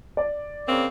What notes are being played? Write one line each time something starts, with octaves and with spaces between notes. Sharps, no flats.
D5
C#3 A#3 C4